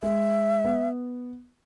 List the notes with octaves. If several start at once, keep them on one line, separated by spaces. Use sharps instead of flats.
G#3 E5
B3